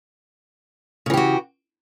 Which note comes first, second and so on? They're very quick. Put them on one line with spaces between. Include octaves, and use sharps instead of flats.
C#3 E3 G4 F#4